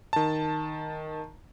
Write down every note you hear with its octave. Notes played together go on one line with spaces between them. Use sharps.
D#3 A5